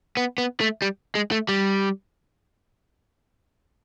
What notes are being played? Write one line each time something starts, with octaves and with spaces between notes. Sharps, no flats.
B3
B3
A3
G3
G#3
A3
G3